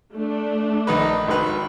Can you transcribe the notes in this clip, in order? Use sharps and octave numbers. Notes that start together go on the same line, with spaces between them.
A3 D4
A#1 D#4 B4
G#1 D#3 B4